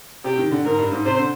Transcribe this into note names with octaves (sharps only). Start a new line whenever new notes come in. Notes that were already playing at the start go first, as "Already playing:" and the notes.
C3 G4
D#3
D3
G#2 A#4
G2
G#2
C3 C5
D3